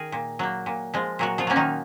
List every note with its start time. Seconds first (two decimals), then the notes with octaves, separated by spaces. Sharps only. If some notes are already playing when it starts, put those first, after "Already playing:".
Already playing: D#3 G#4 A#4
0.12 A#2
0.39 F#3 A#3
0.66 A#2
0.94 F3 G#3
1.19 A#2 F#3 F#4
1.38 F3 F4
1.47 F#3 A#3 C#4
1.56 D#3 D#4